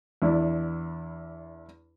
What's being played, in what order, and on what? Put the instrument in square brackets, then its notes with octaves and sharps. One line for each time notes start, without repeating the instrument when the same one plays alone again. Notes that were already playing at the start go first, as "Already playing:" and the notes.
[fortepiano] E2 D4 E4